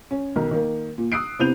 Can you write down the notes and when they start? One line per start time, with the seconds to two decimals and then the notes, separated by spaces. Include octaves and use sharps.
0.11 C#4
0.36 B1 D#3 A#4
0.51 D#3 A#3
0.98 A#2
1.12 D#6 E6 F#6 C7 D7
1.39 C3 B3 E4 G6 D#7 F7